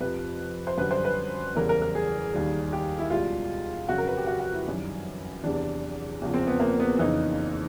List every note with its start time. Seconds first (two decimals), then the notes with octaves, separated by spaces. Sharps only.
0.01 F2 C3 F3 B4
0.67 C5
0.78 F#2 D3 G3 B4
0.91 C5
1.05 B4
1.56 E2 C#3 E3 G3 A#4
1.69 A#4
1.82 A#4
1.95 G#4
2.34 D#2 D#3 G3
2.73 G4
2.99 E4
3.10 C#2 B2 G3 F4
3.89 F2 C#3 F#3 F#4
3.98 A#4
4.08 B4
4.17 G4
4.27 F#4
4.40 F#4
4.53 E4
4.66 F#2 D#3 G3
5.44 E2 C3 E3 D4
6.22 E2 C#3 F3
6.34 C4
6.47 B3
6.60 A#3
6.79 B3
6.98 F2 C#3 E3 D#4